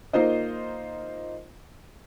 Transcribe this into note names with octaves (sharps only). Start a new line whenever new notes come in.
A#3 D#4 F4 C5 D#5